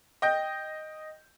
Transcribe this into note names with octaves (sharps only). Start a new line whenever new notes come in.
D#5 G5 G6